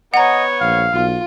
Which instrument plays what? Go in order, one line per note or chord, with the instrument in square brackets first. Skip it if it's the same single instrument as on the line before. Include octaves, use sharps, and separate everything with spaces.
[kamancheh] B3 C#5 [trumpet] D#5 [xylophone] F#5 A#5
[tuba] A#1 [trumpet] F5
[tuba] B1 [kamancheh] F4